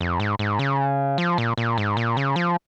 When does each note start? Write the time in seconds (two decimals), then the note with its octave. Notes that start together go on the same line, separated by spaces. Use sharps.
0.01 F2
0.20 G#2
0.39 G#2
0.59 C#3
1.18 F3
1.38 A#2
1.58 A#2
1.78 G#2
1.97 A#2
2.17 C#3
2.36 F3